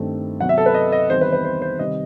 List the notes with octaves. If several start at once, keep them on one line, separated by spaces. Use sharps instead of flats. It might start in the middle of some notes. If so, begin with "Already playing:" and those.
Already playing: G2 D#3 A3 C4
C3 F#3 B3 F#5
E5
A4
B4
D#5
D#5
E2 D#3 G3 C4 C5
B4
B4
C5
C5
C3 D#3 G3 D#5